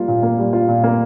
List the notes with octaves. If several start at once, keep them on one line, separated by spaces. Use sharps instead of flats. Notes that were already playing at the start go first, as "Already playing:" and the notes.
Already playing: G3 A#3 F4
A#2
A#3
G3
F4
A#2
A#3